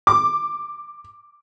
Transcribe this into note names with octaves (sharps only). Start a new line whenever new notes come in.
D6